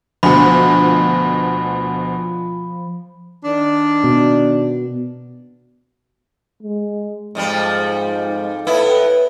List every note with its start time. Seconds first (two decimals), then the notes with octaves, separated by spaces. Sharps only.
0.23 D2 B2 F3 B5
3.44 D#3 D4
4.04 B2
6.62 G#3
7.35 F2 G#2 F3 G3
8.67 A2 B3 E4 A4 B4